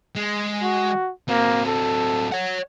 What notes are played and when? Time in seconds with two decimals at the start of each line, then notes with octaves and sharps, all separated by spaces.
0.16 G#3
0.63 F#4
1.28 F#3 A#3 C4
1.66 A4
2.32 C#5 F#5